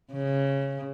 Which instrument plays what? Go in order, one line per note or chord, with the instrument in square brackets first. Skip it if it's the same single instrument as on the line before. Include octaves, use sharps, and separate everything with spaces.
[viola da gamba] C#3